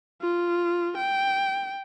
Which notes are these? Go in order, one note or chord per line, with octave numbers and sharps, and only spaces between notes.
F4
G5